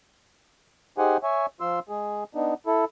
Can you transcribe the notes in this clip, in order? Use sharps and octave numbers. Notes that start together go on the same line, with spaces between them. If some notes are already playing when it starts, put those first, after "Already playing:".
D#4 G4 G#4 C5 F#5 G#5
C#5 E5 G#5
F3 F4 C6 E6
G#3 G#4
B3 D4 D#4
E4 A4